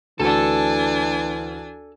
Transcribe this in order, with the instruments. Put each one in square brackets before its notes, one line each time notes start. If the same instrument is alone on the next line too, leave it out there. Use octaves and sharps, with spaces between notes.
[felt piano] D2 [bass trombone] E3 [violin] D4 G#5 [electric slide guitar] A4 A5